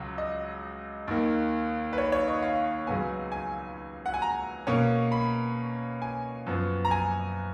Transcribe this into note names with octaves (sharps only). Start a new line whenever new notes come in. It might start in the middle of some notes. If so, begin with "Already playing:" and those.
Already playing: C#2 C#3 F#3
D#5
D#2 D#3 A#3
B4
C#5
C#5
D#5
F5
C#2 C#3 F#3 B3 G#5
G#5
F#5
G#5
A#5
B2 A#3 C#4
B5
G#5
F#2 F3 B3
A#5
G#5